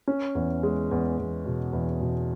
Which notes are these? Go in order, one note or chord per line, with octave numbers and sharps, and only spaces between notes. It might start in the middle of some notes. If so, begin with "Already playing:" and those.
C#4
E2
G#3
E2
E2
B2
E2
B2